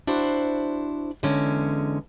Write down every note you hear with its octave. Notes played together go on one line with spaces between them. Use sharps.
D4 E4 F#4 C5
E2 D3 G#3 C#4